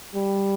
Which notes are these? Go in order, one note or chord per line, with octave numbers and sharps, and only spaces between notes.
G3